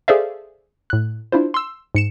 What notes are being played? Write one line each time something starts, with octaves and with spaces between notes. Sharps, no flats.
G#4 A4 C5 D5 E5 F5
A2 F#6
D4 E4 F4 C5
C6 E6
G#2 C#7 E7